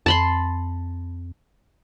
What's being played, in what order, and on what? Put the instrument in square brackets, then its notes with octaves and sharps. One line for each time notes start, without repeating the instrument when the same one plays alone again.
[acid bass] F2 [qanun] A5 B5 C6